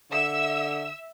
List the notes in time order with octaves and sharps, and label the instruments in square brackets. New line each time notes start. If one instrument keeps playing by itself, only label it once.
[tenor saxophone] D3 [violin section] E5 E6